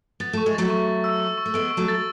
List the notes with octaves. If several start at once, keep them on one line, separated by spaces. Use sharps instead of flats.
B3 A6
A3 C#6
G#3
F#3 A3 A6
C#6
C#6
E6
C#6
C#6
A3
G#3 B3 D7
C#6
F#3 A3
A6